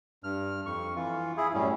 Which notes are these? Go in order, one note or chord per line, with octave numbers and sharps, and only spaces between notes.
G2 F6
F2 C#6
E3 F4
E4 G#4
F#2 A2 G3 C#4